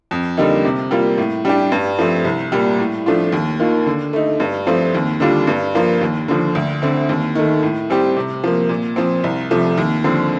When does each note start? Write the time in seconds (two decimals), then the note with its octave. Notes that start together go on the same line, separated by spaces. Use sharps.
0.11 F2
0.37 D3 G3 A#3 D#4
0.65 C3
0.91 G3 A#3 F4
1.18 A2
1.45 G3 D4 G4
1.72 G2
1.99 F3 A3 C4
2.25 C2
2.52 A#2 G3
2.79 A2
3.06 F3 A3 D4 F4
3.32 D#2
3.60 D#3 A#3 F4
3.86 D3
4.13 A3 D#4
4.40 G2
4.67 F3 A3 C4 F4
4.94 D#2
5.20 D3 G3 D4 F4
5.47 G2
5.75 F3 A#3 F4
6.01 D#2
6.28 D3 F3
6.55 D2
6.82 D3 A3 C4
7.09 D#2
7.35 D#3 A3
7.62 A2
7.90 G3 C4 G4
8.16 C3
8.44 F3 A#3
8.69 A#2
8.96 F3 C4
9.24 C2
9.51 C3 F3 A3
9.78 D#2
10.04 D3 F3 C4